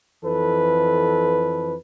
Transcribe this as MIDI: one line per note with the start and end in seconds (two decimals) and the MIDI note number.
0.24 1.73 41
0.24 1.73 52
0.24 1.73 69
0.24 1.73 71